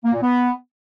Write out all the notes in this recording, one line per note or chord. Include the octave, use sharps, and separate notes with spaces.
A#3
A#2
B3